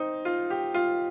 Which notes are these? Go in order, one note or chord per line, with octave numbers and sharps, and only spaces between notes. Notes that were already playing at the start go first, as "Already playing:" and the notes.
Already playing: C4 D#4
F4
G4
F4